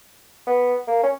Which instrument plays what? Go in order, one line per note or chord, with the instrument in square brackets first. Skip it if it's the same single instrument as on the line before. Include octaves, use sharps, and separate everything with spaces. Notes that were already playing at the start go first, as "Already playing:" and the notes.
[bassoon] B3
A#3
C#4